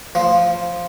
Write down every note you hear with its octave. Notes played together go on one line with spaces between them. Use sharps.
F3